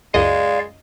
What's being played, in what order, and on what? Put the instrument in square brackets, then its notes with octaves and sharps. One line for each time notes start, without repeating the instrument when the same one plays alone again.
[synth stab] C#2 F#2 D#5 [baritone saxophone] G#3 [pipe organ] D5 F5